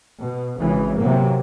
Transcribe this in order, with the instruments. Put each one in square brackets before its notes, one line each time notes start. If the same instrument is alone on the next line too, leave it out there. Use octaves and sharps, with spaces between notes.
[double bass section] B2
G#1 C#3 E3
C3 E3 F#3 A#3